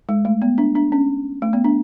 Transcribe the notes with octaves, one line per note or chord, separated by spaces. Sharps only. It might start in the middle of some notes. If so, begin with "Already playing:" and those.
G#3
A3
B3
D4
D4
C#4
A3
B3
D4